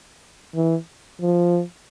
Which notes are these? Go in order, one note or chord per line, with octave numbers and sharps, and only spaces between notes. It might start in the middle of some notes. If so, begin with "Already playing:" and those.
E3
F3